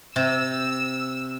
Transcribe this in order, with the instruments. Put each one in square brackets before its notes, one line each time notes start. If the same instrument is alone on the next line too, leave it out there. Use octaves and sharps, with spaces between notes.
[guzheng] C3 [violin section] E6